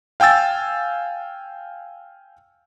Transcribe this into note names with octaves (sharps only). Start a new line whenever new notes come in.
F5 G5 G#5 E6 A6